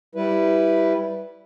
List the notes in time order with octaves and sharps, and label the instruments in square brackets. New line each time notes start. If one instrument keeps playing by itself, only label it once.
[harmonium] G3 E4 B4